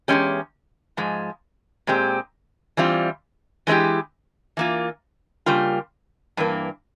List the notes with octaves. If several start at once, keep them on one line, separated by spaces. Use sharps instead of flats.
E2 E3 G#3 C#4 G4
G#2 F3 G#3
A#2 G#3 C4 G4
E3 G3 C4 F4
E3 G#3 C4 E4 G4
E3 A#3 F4
C#3 G3 A#3 F4
G2 E3 A#3